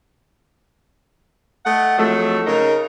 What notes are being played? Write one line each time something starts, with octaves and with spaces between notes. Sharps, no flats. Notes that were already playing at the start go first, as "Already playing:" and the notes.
A3 D#5 F#5
F2 F#3 G#3 A3
C#3 D#4 A#4